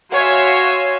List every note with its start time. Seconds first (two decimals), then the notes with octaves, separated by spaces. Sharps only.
0.13 F#4 C#5 E5 F5 G#5 C6